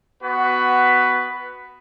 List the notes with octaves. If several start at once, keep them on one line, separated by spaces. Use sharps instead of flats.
B3 F#4 B4